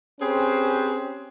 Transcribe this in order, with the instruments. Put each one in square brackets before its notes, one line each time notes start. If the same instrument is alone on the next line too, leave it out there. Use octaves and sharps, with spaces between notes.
[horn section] C4 C#4 G4 G#4 B4 C5